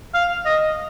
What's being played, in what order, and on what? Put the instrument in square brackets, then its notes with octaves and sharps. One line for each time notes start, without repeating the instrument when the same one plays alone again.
[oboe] F5
D#5